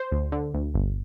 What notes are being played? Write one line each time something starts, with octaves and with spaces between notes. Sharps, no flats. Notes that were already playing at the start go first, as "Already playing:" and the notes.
Already playing: C5
D2
D3
D2
G1